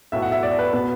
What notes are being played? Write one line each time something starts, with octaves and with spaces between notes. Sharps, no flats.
B1 A2 F#3 B3 E5
F#5
E5
D5
B4
B2 B3 B4